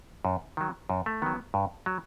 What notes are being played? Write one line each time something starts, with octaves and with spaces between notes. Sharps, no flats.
F#2
D#3 F#3
F#2
A3
D#3 F#3 B3
G2
F#3